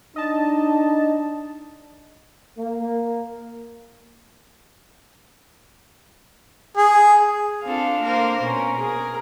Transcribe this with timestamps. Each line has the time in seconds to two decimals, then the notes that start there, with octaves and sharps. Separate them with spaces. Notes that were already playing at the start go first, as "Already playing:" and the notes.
0.16 D4 D#4 D#5 A5
2.57 A#3
6.77 G#4
7.64 C4 D4 F4 A4 F5
8.02 A#3 A#4 C5
8.42 B2 C#4 A#4
8.79 G#4 A#4